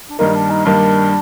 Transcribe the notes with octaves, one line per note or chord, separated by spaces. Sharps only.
D4
G2 D#3 G3 A#3 D#4
D4
D#4
G2 D#3 G3 A#3 D4